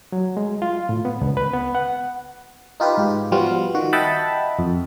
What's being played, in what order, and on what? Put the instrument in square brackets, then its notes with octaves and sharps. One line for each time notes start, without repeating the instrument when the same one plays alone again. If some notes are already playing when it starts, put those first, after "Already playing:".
[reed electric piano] F#3
G#3
F4
A2
B3
C#2
B4
B3
F#5
[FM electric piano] D#4 F4 G4 B4
G#2 G4
F3 G3 B3 F4 F#4
D#3 F#4
D#5 E5 F#5 G5 A5 B5
F2